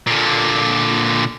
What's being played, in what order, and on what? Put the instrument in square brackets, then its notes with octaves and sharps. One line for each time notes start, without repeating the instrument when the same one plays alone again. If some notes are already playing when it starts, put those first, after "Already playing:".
[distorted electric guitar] A#2 D3